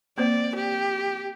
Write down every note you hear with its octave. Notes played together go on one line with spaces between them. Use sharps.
A#3 C4 C5 D5
G4